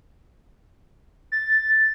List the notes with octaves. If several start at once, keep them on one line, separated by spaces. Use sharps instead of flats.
A6